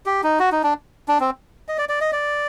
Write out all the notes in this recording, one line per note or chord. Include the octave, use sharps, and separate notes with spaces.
G4
D#4
F#4
D#4
D4
D4
C4
D#5
D5
D5
D#5
D5